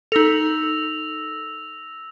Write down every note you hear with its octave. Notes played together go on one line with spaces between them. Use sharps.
D#4 A4 E6 A#6 F7